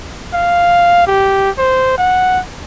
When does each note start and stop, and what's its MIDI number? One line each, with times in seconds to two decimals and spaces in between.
0.34 1.04 77
1.07 1.50 67
1.58 1.97 72
1.98 2.39 78